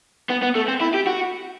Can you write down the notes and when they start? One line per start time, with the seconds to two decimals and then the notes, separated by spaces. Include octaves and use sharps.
0.30 B3
0.43 B3
0.55 A3
0.68 C4
0.81 E4
0.94 G4
1.07 F#4